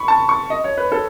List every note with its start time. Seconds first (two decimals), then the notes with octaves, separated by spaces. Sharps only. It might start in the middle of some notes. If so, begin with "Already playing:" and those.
Already playing: B5 C#6
0.08 A5
0.29 C#6
0.50 D#5
0.64 C#5
0.78 B4
0.92 A4